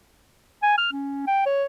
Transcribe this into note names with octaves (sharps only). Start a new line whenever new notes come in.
G#5
F6
C#4
G5
C#5